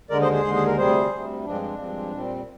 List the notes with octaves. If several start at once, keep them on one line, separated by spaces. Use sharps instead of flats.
D#2 D3 G#3 A#4 D5
C5 D#5
G#4 C5
D#2 D3 G#3
G#4
A#4
D2 C3 G3 G#4 C5
D2 C3 G3
G2 F3 G#3 C4 D4
D4
G2 F3 G#3 C4
A#2 G3 C4